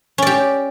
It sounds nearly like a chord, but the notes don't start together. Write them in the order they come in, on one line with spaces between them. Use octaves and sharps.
C#4 D5 G4